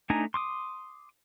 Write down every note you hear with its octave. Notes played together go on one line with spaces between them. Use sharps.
A3 D4 D#4 G#5 A#5
C6 D6 D#6